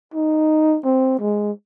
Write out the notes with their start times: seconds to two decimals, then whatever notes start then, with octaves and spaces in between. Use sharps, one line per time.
0.14 D#4
0.84 C4
1.20 G#3